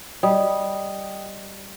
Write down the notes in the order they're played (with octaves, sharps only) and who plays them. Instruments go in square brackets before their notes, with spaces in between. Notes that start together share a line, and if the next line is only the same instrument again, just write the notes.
[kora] G3 [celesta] D#5 G5 D#6